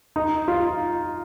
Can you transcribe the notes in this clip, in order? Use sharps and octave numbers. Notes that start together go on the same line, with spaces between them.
D#4
F4